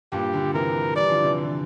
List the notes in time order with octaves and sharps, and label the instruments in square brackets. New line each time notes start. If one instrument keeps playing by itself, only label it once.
[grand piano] G2 A#2 [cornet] G4
[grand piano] A#2 D3
[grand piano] C3 E3 [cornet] A#4
[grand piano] E3 G3 [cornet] D5
[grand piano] D3 F3
C3 E3
D3
E3